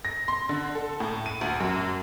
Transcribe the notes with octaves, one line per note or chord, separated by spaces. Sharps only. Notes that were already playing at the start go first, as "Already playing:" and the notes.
A#6
C6
D3
A4
A2
D#7
D2
F#2